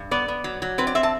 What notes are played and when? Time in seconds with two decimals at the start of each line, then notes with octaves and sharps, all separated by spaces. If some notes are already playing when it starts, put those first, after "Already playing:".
Already playing: G2
0.11 B3 D5
0.28 B3
0.44 F#3
0.62 F#3
0.78 C4 B4
0.87 D5
0.95 C4 E5
1.03 A5